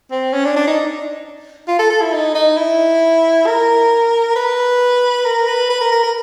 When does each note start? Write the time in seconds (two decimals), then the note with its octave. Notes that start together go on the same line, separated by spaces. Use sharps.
0.11 C4
0.34 C#4
0.45 D4
0.56 D4
0.67 D#4
1.68 F4
1.79 A4
1.90 A4
2.01 E4
2.13 D#4
2.35 D#4
2.57 E4
3.46 A#4
4.36 B4
5.25 A#4
5.48 B4
5.70 B4
5.81 A#4
5.92 A#4
6.03 A#4